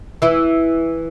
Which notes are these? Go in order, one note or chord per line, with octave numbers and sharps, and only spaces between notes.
E3 E4